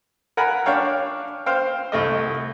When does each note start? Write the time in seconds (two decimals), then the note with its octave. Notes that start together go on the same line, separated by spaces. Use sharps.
0.37 A#4 F#5 G#5 B5
0.66 D4 C#5 F5 G5
1.46 C5 F5 G5
1.92 C2 A3 D#5